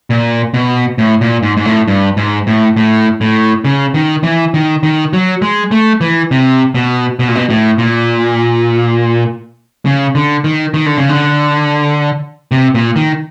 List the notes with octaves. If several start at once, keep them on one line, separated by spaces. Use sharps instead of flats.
A#2
B2
A2
A#2
G#2
G#2
A2
G2
G#2
A2
A2
A2
C#3
D#3
E3
D#3
D#3
F#3
G#3
A3
E3
C3
B2
B2
A#2
B2
A2
A#2
C#3
D3
D#3
D#3
D3
C#3
D3
C3
A#2
D#3